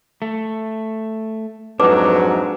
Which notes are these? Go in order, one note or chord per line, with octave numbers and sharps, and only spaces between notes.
A3
F2 G#2 F#3 D4 A4 B4 D6